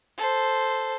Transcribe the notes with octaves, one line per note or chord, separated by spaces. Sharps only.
A4 C5